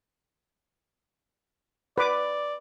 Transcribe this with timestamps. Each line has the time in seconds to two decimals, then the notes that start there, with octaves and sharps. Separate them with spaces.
1.98 B4 D5 D6